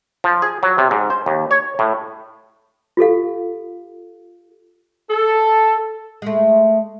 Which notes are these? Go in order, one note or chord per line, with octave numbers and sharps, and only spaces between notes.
F3
G#4
F#3
C3
G#2
C5
D#2
C#5
A2
F4 G4 A4 F5
A4
G#3 A3